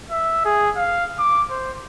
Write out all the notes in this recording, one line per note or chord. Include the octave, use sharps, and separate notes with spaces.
E5
G#4
F5
D6
C5